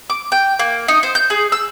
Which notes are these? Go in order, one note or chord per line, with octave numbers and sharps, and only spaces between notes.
D6
G5
A#3
D#4
C5
G6
G#4
E6